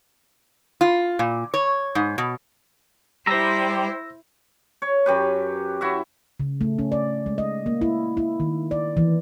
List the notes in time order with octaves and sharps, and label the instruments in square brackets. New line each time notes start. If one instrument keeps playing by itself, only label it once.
[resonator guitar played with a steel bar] F4
A#2
C#5
G#2
B2
[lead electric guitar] G3 [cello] E4 C5 [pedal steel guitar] A#5 C6 [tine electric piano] E6 A#6
[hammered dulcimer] C#5
F#2 G4 B4
E4 F#4 E5
[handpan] C#3
A3
C#4
D5
G#3
D#5
A#3
E4
E4
D#3
D5
E3